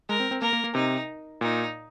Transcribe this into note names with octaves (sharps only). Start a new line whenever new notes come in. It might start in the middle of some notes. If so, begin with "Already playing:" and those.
G#3 A#4
C4
C4
A#3 A#4
A#3
A#3
C3 D#4
A#2 D#4